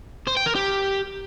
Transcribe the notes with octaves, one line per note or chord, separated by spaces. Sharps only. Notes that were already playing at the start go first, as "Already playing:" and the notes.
C5
G5
A#4
G4